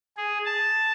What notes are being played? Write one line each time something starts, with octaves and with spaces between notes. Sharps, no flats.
G#4
A5